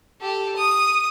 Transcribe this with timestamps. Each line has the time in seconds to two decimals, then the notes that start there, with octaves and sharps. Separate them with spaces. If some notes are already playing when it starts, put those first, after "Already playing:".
0.21 G4 A4
0.56 D#6